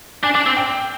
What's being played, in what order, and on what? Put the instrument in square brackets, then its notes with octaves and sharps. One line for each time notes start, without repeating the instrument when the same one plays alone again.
[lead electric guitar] D4 [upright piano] G#5
[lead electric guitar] D4
C4
[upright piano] G5